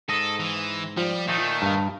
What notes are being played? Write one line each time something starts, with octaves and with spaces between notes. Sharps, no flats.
G#2 A4 D#5
E3
F3 G3
A#2 D#3 A3 D#4
G2 F5